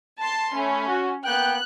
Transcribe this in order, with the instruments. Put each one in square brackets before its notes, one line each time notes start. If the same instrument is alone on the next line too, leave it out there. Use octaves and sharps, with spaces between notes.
[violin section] A5 C6
[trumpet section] A3 B5 [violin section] C#4
[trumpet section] F#4
[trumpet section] A#3 B3 G5 [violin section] F#6